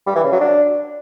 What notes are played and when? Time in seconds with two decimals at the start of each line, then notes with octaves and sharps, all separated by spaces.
0.06 G3
0.15 E3
0.23 C#3
0.32 F#3
0.41 D4